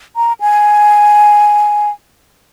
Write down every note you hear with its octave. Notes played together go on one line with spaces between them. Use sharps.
A#5
G#5